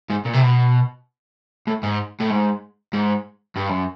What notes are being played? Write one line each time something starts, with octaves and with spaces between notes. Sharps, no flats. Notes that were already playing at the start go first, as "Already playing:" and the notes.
G#2
A#2
C3
B2
A2
G#2
A2
G#2
G#2
G2
F#2